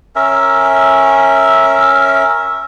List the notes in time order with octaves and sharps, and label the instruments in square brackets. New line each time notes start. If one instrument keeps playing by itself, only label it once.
[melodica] C#4 A#4 E5